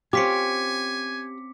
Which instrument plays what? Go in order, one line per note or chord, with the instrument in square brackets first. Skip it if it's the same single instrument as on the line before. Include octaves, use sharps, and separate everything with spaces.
[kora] C4 C#4 F4 [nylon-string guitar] G4 [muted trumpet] G#5 [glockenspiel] D6 B6 C#7